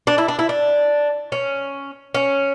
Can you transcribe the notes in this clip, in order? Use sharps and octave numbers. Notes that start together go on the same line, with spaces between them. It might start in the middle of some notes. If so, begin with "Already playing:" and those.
D4
E4
D4
E4
D4
C#4
C#4